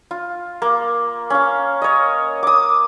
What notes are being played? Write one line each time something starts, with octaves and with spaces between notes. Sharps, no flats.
F4
A#3
C#4 F5
C#5 D#5
D6 D#6